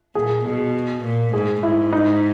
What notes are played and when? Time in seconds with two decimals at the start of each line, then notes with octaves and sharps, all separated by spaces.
0.15 A#2 G#4
0.45 B2 G#4
1.04 A#2
1.33 G#2 G#4
1.63 G#2 E4
1.93 D#4